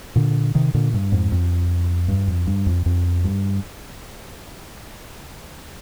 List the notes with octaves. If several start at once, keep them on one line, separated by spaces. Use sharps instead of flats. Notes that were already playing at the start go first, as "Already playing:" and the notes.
A#2 D3
C3 D#3
A#2 D3
G2
F2 G#2
F2
G2
F2
G2
F2
F2
G2